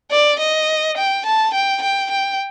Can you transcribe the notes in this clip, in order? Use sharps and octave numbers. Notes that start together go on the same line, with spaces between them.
D5
D#5
G5
A5
G5
G5
G5